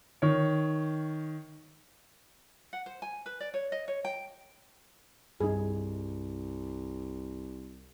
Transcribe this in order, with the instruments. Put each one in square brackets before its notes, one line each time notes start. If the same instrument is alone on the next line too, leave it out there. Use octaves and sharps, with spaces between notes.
[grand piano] D#3 C#5
[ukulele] F#5
C5
G#5
B4
D5
C#5
D#5
C#5
G5
[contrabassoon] C2 [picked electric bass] G2 [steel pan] D#4 G#4